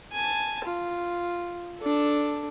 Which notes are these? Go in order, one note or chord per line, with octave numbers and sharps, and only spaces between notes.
G#5 A5
F4
D4 A4